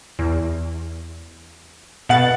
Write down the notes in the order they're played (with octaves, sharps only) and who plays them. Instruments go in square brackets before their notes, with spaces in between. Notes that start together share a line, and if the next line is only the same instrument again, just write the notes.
[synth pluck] E2
[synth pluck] B2 A6 [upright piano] F#5 F#7